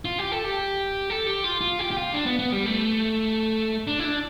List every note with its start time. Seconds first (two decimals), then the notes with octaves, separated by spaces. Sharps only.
0.05 F4
0.19 G4
0.32 A4
0.44 G4
1.10 A4
1.27 G4
1.44 F4
1.61 F4
1.79 G4
1.91 G4
1.97 F4
2.14 D4
2.26 B3
2.39 B3
2.52 G3
2.66 A3
3.87 D4
3.99 E4
4.05 D4